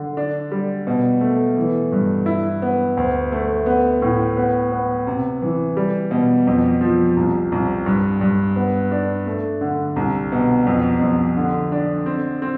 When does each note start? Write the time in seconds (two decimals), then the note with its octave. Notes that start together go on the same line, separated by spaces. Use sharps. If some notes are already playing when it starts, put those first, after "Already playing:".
Already playing: D3
0.17 D4
0.51 G3
0.87 B2
1.21 A3
1.57 E3
1.92 G2
2.26 E4
2.62 B3
2.97 D2
3.32 A3
3.66 B3
4.02 A2
4.37 B3
4.72 B3
5.07 C3
5.42 E3
5.77 G3
6.11 B2
6.47 F2
6.81 F3
7.17 C2
7.52 C2
7.86 G2
8.21 G2
8.56 B3
8.92 D4
9.26 A3
9.61 D3
9.96 C2
10.32 B2
10.67 F2
11.02 F2
11.37 D3
11.72 D4
12.06 C4
12.42 C4